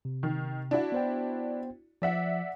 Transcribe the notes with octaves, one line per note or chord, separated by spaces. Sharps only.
C3
D#3
D4 E4 F#4
B3 C5 G5
F3 D5 E5 F#5